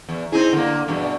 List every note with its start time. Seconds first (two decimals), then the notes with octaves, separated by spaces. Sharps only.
0.09 E2
0.32 C4 D#4 E4 G#4
0.53 D3 A#3
0.88 E2 G2 B2